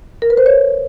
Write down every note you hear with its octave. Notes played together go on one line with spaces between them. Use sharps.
A#4
B4
C5
C#5